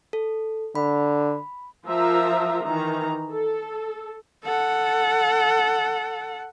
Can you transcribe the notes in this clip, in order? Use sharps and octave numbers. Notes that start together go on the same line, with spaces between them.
A4
D3 B5
F3 F4 A#4 E5 A#5
D#3 E3 A#5
A4
A4 F#5